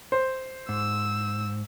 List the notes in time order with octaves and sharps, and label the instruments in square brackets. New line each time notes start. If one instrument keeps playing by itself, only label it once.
[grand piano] C5
[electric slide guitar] G#2 [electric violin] E6